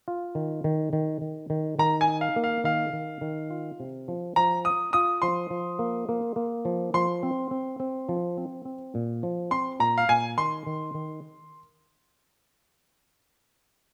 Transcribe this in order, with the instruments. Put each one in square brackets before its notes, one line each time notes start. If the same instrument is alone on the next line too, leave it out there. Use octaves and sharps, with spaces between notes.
[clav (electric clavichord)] F4
D#3
D#3
D#3
D#3
D#3
[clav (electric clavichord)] D#3 [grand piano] A#5
[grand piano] G#5
[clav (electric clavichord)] D#4
[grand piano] F5
[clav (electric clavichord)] A#3
[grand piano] F5
[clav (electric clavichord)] D#3 [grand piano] F5
[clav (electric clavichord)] D#3
D#3
F4
C3
F3
[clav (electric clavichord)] F3 [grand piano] A#5
[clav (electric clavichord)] F4 [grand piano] D#6
[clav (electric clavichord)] F4 [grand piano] D#6
[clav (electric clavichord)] F3 [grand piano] C6
[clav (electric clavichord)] F3
A#3
A#3
A#3
F3
[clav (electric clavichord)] F3 [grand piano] C6
[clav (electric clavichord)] C4
C4
C4
F3
C4
C4
A#2
F3
[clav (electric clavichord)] C4 [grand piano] C6
[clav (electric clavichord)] A#2 [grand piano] A#5
[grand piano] F5
[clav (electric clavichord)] A#2 [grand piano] G#5
[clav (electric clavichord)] D#3 [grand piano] C6
[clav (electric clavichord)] D#3
D#3